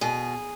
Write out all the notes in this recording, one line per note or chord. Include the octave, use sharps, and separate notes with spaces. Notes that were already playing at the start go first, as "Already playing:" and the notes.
B2 G#4